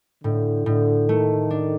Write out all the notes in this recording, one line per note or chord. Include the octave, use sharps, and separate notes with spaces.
A2 D3
A2 D3
D#3 A3
D4